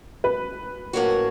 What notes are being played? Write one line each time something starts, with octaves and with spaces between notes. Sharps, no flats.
B4
A2 F#3 A#3 C#4 F#4